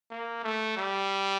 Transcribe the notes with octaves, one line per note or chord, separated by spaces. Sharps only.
A#3
A3
G3